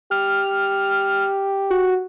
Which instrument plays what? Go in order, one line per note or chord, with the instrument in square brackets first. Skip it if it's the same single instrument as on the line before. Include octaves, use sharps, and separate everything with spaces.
[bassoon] G4 [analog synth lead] F6
[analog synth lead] F#4